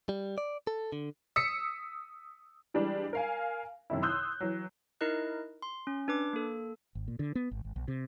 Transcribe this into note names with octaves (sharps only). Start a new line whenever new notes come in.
G3
D5
A4
D3
D#6 E6 B6 C#7
E3 G3 G#3 D4
A#4 F5 G#5
F#2 C3 D#3 E4
C6 D#6 E6 F#6 G6
E3 F#3
D#4 E4 A#4 D#5 F#6
C6
C#4
D4 B4 D6
A#3 A4
G#1
A#2
D3
B3
G#1
G#1
B1
C3